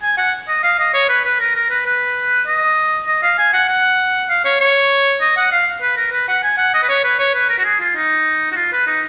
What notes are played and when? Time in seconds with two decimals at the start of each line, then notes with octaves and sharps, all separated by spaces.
0.02 G#5
0.18 F#5
0.48 D#5
0.63 F5
0.79 D#5
0.94 C#5
1.09 B4
1.25 B4
1.40 A#4
1.55 A#4
1.70 B4
1.86 B4
2.47 D#5
3.07 D#5
3.23 F5
3.38 G#5
3.54 F#5
3.69 F#5
4.29 F5
4.45 C#5
4.60 C#5
5.21 D#5
5.37 F#5
5.52 F5
5.82 B4
5.97 A#4
6.12 B4
6.28 F#5
6.43 G#5
6.58 F#5
6.74 D#5
6.83 B4
6.89 C#5
7.04 B4
7.19 C#5
7.34 B4
7.50 A#4
7.59 F#4
7.65 G#4
7.80 F4
7.96 D#4
8.52 F#4
8.56 F4
8.72 B4
8.87 D#4